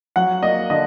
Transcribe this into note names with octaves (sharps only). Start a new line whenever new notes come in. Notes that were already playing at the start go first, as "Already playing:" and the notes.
F#3 F#5
A#3 D#5
D3 D#5